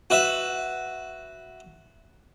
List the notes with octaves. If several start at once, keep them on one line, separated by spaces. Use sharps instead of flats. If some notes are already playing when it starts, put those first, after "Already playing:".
F#4 B4 E5